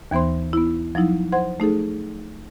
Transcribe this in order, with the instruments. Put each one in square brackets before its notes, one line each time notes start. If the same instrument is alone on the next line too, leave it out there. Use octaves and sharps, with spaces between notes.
[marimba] D#2 E3 B3 C5 C6
B3 E4
F3 F#3 D#4 E4
C5 F#5 C6 G#6
A3 D#4 G#4 A4